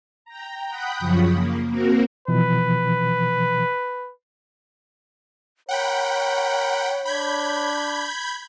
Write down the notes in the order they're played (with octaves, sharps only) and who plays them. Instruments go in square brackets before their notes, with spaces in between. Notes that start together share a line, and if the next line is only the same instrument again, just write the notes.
[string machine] G5 A#5
F#5 G5 B5 D#6 F#6 G6
F#2 C#3 F3 B5 C#6 D#6
A#3
A#3 C4 F#4 A#4
[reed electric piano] B2 E3 F3 [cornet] B4
[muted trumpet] A#4 [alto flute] C#5 [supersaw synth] F#5 G5 B5
[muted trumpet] D4 [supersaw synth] B5 G6 G#6